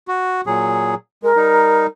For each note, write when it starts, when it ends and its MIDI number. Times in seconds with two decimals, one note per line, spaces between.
0.08 0.41 66
0.46 0.95 46
0.46 0.95 54
0.46 0.95 68
1.23 1.32 56
1.23 1.85 70
1.36 1.87 55
1.36 1.87 63